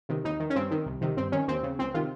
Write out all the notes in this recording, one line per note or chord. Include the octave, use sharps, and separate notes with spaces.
C3 D#3
D#2 D#4
D#3
C#4
G2 C4
D#3
C2
C3 D#3
G2 C4
D#3 C#4
D#2 C4
C#3
C#2 C4
C3 D#3 F4